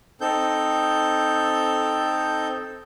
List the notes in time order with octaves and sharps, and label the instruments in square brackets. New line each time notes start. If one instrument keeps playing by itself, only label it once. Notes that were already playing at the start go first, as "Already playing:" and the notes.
[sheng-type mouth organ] C4 D#4 A4 G6